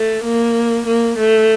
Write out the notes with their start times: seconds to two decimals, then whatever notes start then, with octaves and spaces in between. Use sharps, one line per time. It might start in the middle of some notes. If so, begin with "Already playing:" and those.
Already playing: A3
0.24 A#3
0.86 A#3
1.18 A3